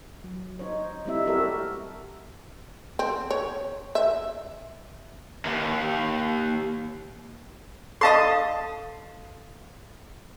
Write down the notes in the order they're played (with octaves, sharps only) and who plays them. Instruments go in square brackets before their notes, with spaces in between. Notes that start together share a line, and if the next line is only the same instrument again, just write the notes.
[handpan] F#3
D#4 C5 C#5
G3 A3 C4 D#4 E4 E5
E4 F#4 G4 A4 A#4 E5
[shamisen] C4
C#5
E5
[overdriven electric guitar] D#2 D#3
[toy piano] A4 F5 [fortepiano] D#5 A5 C6